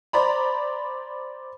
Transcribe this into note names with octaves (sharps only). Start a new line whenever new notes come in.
C5 D5 A#5 B5